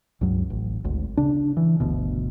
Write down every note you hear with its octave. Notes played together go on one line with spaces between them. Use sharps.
C#2 G2 F#3
A1
G#1 D2 G#2
C#3 D4
E3
G1 D2 B2